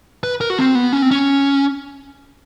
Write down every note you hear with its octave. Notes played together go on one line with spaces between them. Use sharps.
B4
A#4
F#4
C4
B3
C#4
C4
C#4